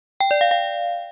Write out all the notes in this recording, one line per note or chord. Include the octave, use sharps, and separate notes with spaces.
G5
D5
F5
F5